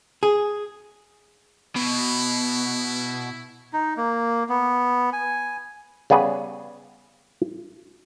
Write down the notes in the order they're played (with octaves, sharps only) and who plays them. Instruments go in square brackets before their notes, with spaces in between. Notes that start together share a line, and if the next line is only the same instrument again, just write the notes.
[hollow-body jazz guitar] G#4
[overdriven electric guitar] B2 [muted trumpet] E4
[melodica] D#4
A#3
B3
G#5
[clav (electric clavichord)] C#3 G3 B3 G#4 B4